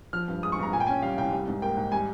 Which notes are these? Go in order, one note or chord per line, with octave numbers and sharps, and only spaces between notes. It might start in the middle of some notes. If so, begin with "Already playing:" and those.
F3 F6
G2
G#3 D#6
C#6
G2 A#5
A#2 G#5
G5
C#4 G#5
G3 F5
C2 G5
G3
G#2
A#3 G5
G#2
G3 G#5